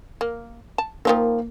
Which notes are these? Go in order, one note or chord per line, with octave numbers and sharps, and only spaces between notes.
A#3
A5
D#3 F3 F#3 A#3